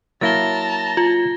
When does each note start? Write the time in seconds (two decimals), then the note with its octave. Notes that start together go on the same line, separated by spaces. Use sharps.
0.21 F#3 A#3 E4 A5 A#5 A6 A#6 G7
0.97 F4